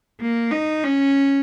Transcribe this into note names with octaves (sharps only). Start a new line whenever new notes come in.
A#3
D#4
C#4